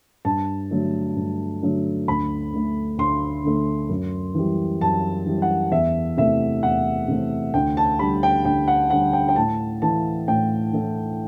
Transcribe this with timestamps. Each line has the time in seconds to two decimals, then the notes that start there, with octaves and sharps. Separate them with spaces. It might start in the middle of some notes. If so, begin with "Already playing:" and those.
0.25 G2 A5
0.71 D3 F#3 A3
1.16 G2
1.63 D3 F#3 A3
2.08 D2 B5
2.53 D3 A3
2.98 D2 C6
3.44 D3 A3
3.89 F#2
4.35 E3 G3
4.81 F#2 A5
5.26 E3 G3
5.42 F#5
5.71 E2 E5
6.17 C3 E3 A3 E5
6.63 E2 F#5
7.08 C3 E3 A3
7.54 D2 G5
7.77 A5
7.99 D3 G3 B5
8.23 G5
8.45 D2 G5
8.68 F#5
8.90 D3 G3 F#5
9.13 G5
9.29 G5
9.36 A2 A5
9.82 E3 A3 A5
10.28 A2 G5
10.73 E3 A3